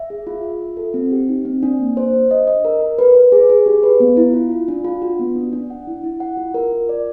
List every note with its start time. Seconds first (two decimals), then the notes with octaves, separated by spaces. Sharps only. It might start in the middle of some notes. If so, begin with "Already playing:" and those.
Already playing: E5
0.10 G#4
0.27 F4
0.44 E5
0.61 F4
0.77 A4
0.94 C4
1.11 G4
1.29 D#4
1.45 C4
1.63 D4
1.80 A#3
1.97 C5
2.13 D4
2.31 D#5
2.47 D#5
2.65 A#4
2.81 A#4
2.98 B4
3.15 B4
3.32 G#4
3.50 G#4
3.66 G4
3.83 B4
4.00 B3
4.17 E4
4.34 F4
4.52 F4
4.68 D4
4.84 F4
5.02 F#4
5.19 B3
5.35 D4
5.53 D4
5.70 F#5
5.87 E4
6.04 E4
6.20 F#5
6.37 F4
6.54 A#4
6.72 F4
6.89 D5